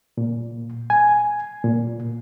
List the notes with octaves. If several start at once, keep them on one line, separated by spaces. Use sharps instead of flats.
A#2
G#5
A#2